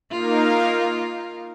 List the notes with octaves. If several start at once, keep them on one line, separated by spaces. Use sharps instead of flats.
A#3 D#4 F4 A#4 F5